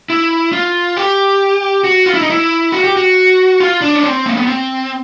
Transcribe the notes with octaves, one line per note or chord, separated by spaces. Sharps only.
E4
F4
G4
F#4
F4
E4
D#4
E4
F#4
G4
F#4
F4
D4
C#4
C4
A#3
B3
C4